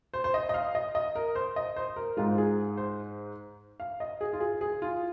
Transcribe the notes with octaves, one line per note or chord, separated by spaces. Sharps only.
C5
C5
D#5
D#5
F5
D#5
D#5
A#4
C5
D#5
C5
A#4
G#2 G#3 F4
G#4
C5
F5
D#5
G#4
F4
G#4
G#4
F4